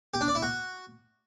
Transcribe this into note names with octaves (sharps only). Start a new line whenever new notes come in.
G4
D4
D5
E4
F#4